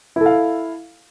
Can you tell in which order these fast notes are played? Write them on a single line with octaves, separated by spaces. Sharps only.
E4 A4 F5